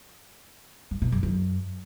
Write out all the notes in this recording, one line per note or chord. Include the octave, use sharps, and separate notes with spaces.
G2
B2
F#2
F#2